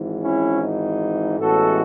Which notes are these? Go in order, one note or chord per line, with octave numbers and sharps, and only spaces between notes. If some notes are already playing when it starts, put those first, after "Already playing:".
Already playing: G#1 G#2 E3
C#4 E4
D#4
A1 A2 E3 G#3 B3 F#4 A4